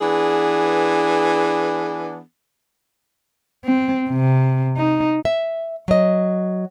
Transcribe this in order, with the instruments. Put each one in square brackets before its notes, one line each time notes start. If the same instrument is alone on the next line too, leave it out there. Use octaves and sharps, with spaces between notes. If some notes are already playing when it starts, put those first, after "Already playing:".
[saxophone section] E3 B3 D4 G#4
[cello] C4
C3
D#4
[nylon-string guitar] E5
F#3 D#5